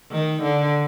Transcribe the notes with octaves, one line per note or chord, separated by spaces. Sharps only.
D#3
D3